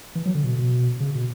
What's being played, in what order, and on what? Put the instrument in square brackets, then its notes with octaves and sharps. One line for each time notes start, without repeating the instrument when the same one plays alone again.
[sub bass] E3
F#3
D3
B2
B2
C#3
B2